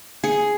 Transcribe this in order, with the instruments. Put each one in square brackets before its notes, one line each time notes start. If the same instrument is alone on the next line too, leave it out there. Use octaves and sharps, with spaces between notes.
[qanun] G#4